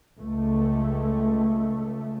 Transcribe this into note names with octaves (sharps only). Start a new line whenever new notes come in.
C#2 A3